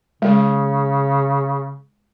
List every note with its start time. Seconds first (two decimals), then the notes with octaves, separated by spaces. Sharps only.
0.22 C#3 G#3